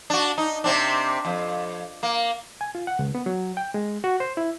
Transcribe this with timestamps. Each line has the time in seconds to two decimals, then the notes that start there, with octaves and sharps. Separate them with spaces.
0.10 D4 F#4
0.38 D#4
0.64 C3 C4 D4
1.25 F2
2.03 A#3
2.61 G#5
2.75 F4
2.87 F#5
2.99 C#2
3.15 B3
3.26 F#3
3.57 G5
3.74 G#3
4.04 F#4
4.20 C5
4.37 E4